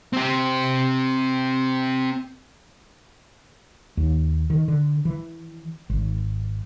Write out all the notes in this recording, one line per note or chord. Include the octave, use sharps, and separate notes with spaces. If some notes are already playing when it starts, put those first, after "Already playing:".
C4 G4
D#2
D#3
D3
E3
G#1